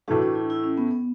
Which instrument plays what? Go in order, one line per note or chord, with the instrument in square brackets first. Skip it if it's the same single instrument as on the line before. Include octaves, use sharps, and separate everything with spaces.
[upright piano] A2 E3 A3 [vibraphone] D4 F#4
[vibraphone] D4
E4
E4
C#4
B3
B3